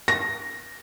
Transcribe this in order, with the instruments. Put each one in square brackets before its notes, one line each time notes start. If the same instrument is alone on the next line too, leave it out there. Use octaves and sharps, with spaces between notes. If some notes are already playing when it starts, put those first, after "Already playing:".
[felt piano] A#6